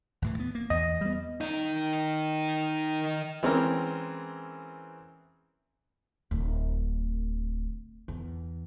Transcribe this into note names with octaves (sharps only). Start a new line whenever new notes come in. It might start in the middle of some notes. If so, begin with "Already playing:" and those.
D#2 A2 E3
B3
A#3
E2 D#5
G3 B3
D#3 D#4
E3 G#3 C4 C#4 A#4
D1
E2